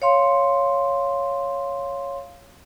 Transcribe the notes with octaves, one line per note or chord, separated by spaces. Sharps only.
C#5 F5 C6